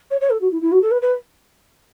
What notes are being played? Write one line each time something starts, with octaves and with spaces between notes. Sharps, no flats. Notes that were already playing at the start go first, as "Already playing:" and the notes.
C#5
C#5
A4
F#4
E4
E4
F#4
A4
B4
B4